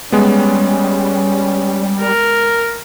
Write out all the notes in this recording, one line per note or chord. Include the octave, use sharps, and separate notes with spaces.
G3 G#3 B3 C#4
A#4